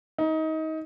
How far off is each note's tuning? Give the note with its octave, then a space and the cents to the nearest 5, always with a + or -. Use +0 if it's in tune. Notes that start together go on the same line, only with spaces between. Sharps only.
D#4 +25